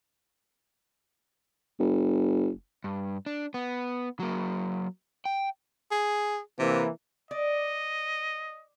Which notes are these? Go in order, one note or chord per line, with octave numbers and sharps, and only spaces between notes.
F#1
G2
D4
B3
F#3 A#3
G5
G#4
C3 E3 A#3
D5 D#5